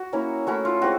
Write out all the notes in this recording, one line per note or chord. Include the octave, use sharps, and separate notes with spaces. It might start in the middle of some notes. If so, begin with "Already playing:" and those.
Already playing: F#4
A#3 C#4 E4
A3 C#4 E4 F#4
F4
G#3 C4 F#4